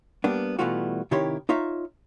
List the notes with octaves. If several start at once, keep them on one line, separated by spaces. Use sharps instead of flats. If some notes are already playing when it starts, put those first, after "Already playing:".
G3 A#3 B3 D4
B2 E3 G3 A3 F4 F#4
C3 D#3 E4 G4 C#5 C6
D#4 F4 C#5 E5